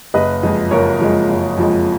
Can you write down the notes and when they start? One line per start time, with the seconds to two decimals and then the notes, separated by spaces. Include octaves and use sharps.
0.14 F#1 B4 D#5
0.43 F2 F3 G#3
0.71 F#1 A#4 C#5
1.00 F2 F3 G#3
1.29 F#1
1.57 F2 F3 G#3